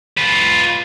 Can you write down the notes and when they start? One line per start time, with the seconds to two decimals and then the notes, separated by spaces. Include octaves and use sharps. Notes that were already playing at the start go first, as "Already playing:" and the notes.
0.17 F4 B4